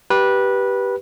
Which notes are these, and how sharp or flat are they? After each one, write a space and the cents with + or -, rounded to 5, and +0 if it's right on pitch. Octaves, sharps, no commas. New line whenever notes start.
G4 -10 B4 -15